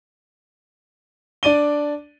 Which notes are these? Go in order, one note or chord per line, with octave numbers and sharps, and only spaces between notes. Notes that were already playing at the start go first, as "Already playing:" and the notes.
D4 D5 D#7 G7